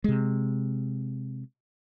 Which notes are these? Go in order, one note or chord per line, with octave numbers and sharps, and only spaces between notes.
C3 G#3